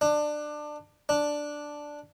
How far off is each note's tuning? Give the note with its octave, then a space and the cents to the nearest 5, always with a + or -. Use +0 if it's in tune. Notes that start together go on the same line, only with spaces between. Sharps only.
D4 +20
D4 +0